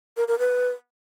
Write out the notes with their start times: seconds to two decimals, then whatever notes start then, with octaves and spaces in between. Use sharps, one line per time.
0.17 A#4
0.28 A#4
0.39 B4